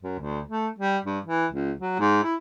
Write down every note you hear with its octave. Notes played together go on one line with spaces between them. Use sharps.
F#2
D2
A3
G3
G2
E3
C#2
F#3
G#2
E4